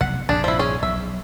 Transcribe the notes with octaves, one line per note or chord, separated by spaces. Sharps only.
F1 B1 C3 F#5
A#1 G2 C3 D4 G#4
F3 E4
C#4 G#4
B1 E5